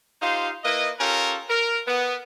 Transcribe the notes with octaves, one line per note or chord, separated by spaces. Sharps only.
D#4 F4 G4 C5 F5
A#3 E4 B4 D#5
C#4 F4 G4 A4 A#4
A#4
B3